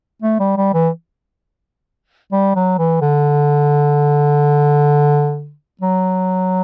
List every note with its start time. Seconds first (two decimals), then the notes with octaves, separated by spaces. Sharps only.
0.22 A3
0.40 G3
0.57 G3
0.74 E3
2.32 G3
2.56 F#3
2.78 E3
3.01 D3
5.81 F#3